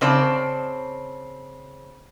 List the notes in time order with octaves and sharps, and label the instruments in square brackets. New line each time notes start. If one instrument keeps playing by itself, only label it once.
[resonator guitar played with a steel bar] C#3 C4 D5 A5